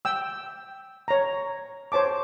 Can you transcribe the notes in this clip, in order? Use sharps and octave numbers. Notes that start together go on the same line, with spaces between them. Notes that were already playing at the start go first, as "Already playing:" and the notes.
G5 E6
C#5 A#5
C5 C#5 A5 D6